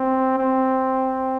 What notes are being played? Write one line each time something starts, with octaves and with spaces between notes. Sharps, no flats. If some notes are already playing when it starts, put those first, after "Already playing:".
Already playing: C4
C4